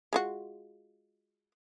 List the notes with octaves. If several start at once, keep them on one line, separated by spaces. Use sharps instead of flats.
G#3 F4 F#4